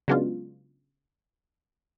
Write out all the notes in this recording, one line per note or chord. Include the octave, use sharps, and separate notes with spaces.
C#3 F#3 G#3 B3 D4 F4